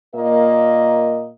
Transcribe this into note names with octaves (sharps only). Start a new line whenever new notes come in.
A#2 A#3 A#4 D#5